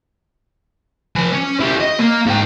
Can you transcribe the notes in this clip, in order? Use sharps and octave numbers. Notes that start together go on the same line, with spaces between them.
F3 G#5
C#4
E4 G4
D#5
A#3
G#2 G5